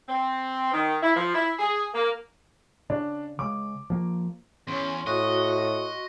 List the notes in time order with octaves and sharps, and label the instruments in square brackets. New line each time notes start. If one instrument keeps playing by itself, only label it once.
[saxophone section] C4
D#3
E4
F3
E4
G#4
A#3
[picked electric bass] C#3 [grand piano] D4
[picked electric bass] C#3 G#3 [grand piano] D6
[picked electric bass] F3 A#3
[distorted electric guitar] E2 [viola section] C#4 [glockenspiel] C6
[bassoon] A2 [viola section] F#4 [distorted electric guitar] D#5 [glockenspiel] C#6 F#6